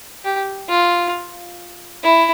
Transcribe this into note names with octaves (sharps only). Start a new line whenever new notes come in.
G4
F4
E4